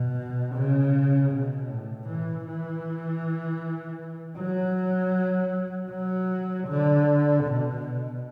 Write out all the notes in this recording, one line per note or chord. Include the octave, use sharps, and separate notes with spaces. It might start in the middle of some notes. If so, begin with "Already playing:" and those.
Already playing: B2
C#3
B2
A2
E3
E3
F#3
F#3
D3
B2